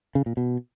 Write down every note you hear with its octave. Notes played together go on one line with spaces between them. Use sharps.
C#3
A#2
B2